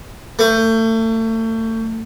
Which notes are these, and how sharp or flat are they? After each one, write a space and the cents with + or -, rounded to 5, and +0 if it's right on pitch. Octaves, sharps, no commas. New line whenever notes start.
A3 +35